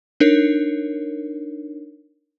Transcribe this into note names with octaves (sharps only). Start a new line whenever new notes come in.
D4 D#4 A#4 C#5